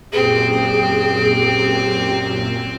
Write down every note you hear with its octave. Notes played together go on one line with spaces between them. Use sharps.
F#2 A#2 C4 G4 G#4